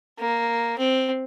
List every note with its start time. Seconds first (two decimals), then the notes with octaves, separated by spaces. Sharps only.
0.19 A#3
0.78 C4